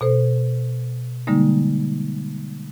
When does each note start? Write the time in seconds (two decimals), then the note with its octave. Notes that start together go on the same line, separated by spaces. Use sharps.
0.01 B2 A4 C5
1.27 D3 G3 G#3 A#3 D#4